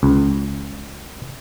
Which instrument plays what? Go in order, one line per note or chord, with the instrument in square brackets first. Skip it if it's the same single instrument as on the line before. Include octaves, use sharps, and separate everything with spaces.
[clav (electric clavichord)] C#2